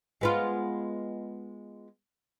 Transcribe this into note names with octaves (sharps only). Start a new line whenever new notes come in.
G#3 B3 F4